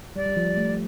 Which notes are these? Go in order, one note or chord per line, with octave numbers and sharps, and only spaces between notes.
G3 D5
G3
F3
G3
A3